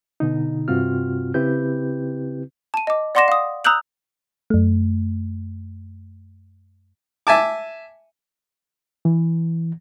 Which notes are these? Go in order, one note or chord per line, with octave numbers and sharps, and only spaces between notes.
B2 D3 D#4
G2 C3 C4 F4 F#4 F6
C#3 C4 E4 G4 B4 G6
A5 D#7
D#5 D6
D5 F#5 C6 D6 A#6 E7
F5 D#6
A#5 D#6 E6 F#6 G6 F#7
F#2 A3
E5 G#5 A5 D6
E3